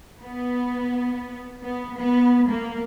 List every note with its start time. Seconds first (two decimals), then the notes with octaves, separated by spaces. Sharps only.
0.22 B3
1.62 B3
1.97 B3
2.50 A#3